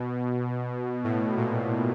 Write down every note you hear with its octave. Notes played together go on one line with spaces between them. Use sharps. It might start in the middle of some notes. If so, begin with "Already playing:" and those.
Already playing: B2
A2
A#2